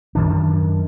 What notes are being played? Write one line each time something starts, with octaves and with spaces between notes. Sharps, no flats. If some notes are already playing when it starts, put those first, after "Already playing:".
F#2 D#3 D4